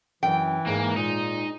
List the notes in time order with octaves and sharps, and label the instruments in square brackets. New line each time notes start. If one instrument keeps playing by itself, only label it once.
[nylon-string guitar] F#2 [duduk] E3 [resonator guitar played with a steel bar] G5
[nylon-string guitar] G#2 G#3 [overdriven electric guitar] A#3
[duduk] A#2 [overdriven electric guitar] D#4